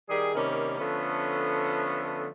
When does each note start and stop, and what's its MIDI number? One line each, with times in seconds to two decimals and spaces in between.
0.09 0.31 51
0.09 0.31 55
0.09 0.31 68
0.34 0.75 48
0.34 0.75 51
0.34 0.75 55
0.34 0.75 58
0.34 0.75 61
0.78 2.27 50
0.78 2.27 53
0.78 2.27 57
0.78 2.27 59
0.78 2.27 61